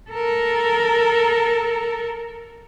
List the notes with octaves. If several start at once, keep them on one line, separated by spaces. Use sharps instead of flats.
A4 A#4